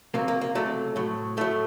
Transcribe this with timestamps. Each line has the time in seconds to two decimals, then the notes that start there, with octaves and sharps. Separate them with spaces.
0.14 C#2 C3 F#3 A#3
0.28 A#3
0.41 A#3
0.55 C#2 C3 F#3 A3
0.96 A2 F#3
1.37 A2 F#3 A3